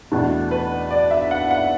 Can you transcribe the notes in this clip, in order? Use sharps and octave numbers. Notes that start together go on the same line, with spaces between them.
E2 B2 A3 D4
B4
D5
E5
F#5
F#5